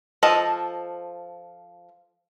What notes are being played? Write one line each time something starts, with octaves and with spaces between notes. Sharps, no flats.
F3 A4 D#5